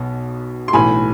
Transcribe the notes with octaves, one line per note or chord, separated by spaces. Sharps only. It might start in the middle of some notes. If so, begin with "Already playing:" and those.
Already playing: B1 B2 B3
C6
B1 A2 E3 A3 G#5 B5